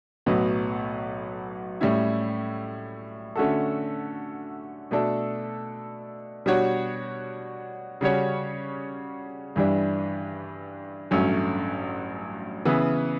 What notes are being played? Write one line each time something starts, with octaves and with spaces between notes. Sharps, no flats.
B1 A2 F#3 B3
A2 G3 C#4 E4
D3 A3 C#4 F#4 A4
B2 A3 D4 A4
B2 G3 D4 F#4 C#5
C#3 G3 C#4 F#4 C#5
G2 E3 G3 D4
A1 G2 F#3 A3 C#4
C#3 E3 B3